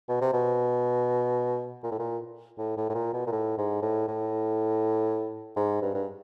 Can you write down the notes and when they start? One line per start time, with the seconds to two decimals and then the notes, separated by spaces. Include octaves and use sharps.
0.08 B2
0.21 C3
0.33 B2
1.83 A#2
1.91 A2
1.99 A#2
2.58 A2
2.77 A2
2.90 A2
2.95 A#2
3.13 B2
3.27 A#2
3.32 A2
3.58 G#2
3.82 A2
4.08 A2
5.56 G#2
5.82 G2
5.94 G2